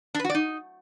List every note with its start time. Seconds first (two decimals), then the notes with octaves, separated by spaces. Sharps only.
0.15 D4
0.20 B4
0.25 F#4
0.30 D5
0.35 D#4